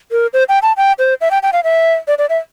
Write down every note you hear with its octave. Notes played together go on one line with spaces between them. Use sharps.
A#4
C5
G5
A5
G5
C5
E5
G5
G5
F5
E5
D5
D5
E5